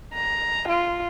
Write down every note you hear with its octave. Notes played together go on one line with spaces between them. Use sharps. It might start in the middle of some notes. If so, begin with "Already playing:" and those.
A#5
F4